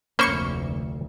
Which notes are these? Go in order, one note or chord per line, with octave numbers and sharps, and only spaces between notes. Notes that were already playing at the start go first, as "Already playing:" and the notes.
F1 D2 A#3 C#4 C5 B5 C#6 C#7